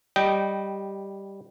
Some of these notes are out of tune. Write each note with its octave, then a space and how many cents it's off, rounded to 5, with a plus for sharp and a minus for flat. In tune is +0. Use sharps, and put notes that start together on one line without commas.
G3 +0 D#5 -5 G5 -15